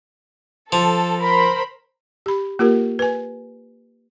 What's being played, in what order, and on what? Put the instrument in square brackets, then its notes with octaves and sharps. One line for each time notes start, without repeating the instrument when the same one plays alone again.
[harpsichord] F3 [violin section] A4
[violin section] A#4 C5 B5
[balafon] G4 B5
A#3 F4 G4 A#4
B4 G#5